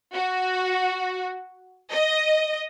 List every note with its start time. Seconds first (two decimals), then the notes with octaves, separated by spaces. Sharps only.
0.14 F#4
1.91 D#5